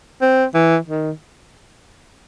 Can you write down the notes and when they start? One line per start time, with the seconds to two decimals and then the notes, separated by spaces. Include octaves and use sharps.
0.21 C4
0.54 E3
0.88 D#3